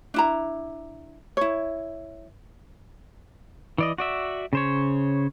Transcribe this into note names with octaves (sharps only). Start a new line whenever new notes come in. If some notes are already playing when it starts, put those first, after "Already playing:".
D4 E4 A#5
E4 C#5
E3 D5 D#5
F#4 D5 E5
C#3 C5 C#5